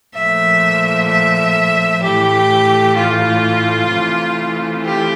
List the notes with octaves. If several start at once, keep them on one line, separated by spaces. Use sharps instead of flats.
A#2 F3 A3 E5
E5
A2 E3 A3 G4
F4
C3 E3 A3
G4